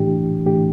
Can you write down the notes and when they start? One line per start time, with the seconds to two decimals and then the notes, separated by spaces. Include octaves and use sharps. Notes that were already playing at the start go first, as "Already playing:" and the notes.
Already playing: A2 E3 A3 D4 G4
0.46 A2 E3 A3 D4 G4